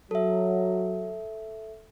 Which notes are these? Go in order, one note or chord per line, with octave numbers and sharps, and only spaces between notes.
F#3 A4 E5